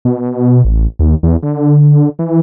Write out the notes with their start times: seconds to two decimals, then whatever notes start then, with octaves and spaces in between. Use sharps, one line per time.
0.05 B2
0.65 A1
0.99 D#2
1.23 E2
1.43 D3
2.19 E3